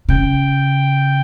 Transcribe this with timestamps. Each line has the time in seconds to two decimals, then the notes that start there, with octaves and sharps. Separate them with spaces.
0.09 C#3 G5